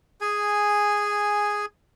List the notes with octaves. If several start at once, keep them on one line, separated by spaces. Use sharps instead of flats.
G#4 G#5